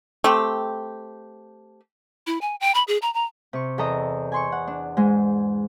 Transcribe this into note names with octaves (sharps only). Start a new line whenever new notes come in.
A3 C4 G4
E4
G#5
G5
B5
G#4
A#5
A#5
C3 C#6
E2 A4 D#5 A#5 D#6
G#5 C6 C#6
F#5
D4
G#2 G#3